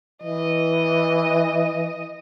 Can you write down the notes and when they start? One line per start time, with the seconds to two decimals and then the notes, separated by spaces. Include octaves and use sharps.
0.24 E3 D#5